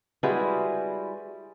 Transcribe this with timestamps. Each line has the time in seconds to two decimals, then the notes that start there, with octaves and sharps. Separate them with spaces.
0.23 G3 G#3 E4 F#4 G#4 B4